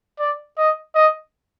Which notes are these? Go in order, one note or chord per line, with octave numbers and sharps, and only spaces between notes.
D5
D#5
D#5